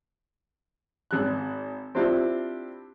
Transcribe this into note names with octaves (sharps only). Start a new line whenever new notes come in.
G#1 F#6
C4 D4 E4 F4 G4